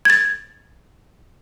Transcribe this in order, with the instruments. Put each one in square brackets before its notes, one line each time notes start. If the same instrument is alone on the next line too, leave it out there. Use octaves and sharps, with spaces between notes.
[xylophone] G#6 A6